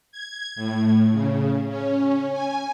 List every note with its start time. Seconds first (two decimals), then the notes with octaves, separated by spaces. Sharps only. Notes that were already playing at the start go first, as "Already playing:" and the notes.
0.12 G#6
0.56 A2
1.12 C#3
1.68 C#4
2.32 G#5